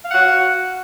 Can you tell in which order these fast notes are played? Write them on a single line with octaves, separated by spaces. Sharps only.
F5 F#5 F#4